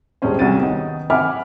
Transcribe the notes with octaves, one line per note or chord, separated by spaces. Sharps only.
D#1 G3 G#3 C#4 C5
C2 C#4 F#4 A6 D#7
D#3 B3 D#4
E5 F#5 G#5 B5 D6 F6